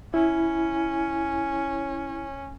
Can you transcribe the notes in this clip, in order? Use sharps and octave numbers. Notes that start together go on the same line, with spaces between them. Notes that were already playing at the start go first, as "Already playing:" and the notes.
C#4 E4